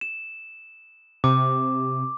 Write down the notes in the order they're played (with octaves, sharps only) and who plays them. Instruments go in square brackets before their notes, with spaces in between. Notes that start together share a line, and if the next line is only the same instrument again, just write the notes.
[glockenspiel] E7
[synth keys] C3 [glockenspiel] D6